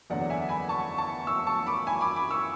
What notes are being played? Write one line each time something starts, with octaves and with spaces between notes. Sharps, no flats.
F#1 E2 D3 F#3 D5 F#5
E5 G#5
G#5 B5
A5 C#6
A5 C#6
C#6 E6
A5 C#6
B5 D6
G#5 B5
B5 D6
B5 D6
C#6 E6